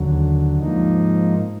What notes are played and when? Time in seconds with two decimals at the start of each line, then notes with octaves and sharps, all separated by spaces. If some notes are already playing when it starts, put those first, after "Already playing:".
Already playing: D#2 D3 F#3
0.58 G#2 F3 A#3 D#4